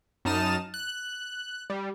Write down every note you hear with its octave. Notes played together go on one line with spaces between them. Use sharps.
F#2 D#4 A5 D#6 F6 E7
F#6
G3